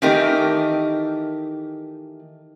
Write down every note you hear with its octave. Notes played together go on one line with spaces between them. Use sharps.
D#3 E3 A3 D#4 G4 A#4